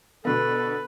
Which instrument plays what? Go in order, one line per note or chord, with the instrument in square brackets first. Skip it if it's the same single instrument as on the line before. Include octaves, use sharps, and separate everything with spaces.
[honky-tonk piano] B2 D3 B3 [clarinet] A4 [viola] B4